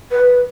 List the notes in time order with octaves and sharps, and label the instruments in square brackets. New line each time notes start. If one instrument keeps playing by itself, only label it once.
[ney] B4